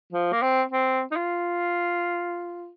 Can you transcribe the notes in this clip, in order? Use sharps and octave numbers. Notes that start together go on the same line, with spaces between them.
F3
A#3
C4
C4
D#4
F4